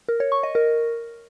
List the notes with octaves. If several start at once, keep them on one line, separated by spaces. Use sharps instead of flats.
A#4
C#5
C#6
D#5
A#4